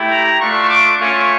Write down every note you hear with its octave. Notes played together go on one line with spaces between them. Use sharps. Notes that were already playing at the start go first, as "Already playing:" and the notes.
Already playing: A3 E4 G4
A#5
A3 D4 F4 C#6
D6
A3 C#4 F4 C#6